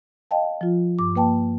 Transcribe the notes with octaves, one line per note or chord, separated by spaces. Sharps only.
D#5 F5 G5 A5
F3 F4
G2 D6
A#3 B4 G5 A5